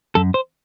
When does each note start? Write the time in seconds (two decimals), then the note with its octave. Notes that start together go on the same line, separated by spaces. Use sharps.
0.15 F#2 A4
0.34 C5